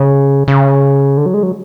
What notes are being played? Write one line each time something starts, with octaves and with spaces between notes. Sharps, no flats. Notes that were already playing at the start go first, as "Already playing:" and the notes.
Already playing: C#3
C#3
D3
F#3
G#3
F#3